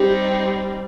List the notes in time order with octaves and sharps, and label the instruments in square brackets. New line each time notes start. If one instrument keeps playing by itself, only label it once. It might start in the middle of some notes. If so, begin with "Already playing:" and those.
Already playing: [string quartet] G3 C4 D#4 [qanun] G4